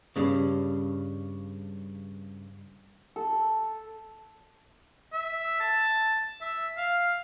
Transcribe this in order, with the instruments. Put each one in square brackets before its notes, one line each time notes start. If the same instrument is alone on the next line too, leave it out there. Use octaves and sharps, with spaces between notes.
[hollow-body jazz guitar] G2 C#3
[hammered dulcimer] A4
[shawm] E5
A5
E5
F5